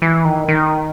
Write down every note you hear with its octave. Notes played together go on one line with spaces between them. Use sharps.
E3
D#3
D#3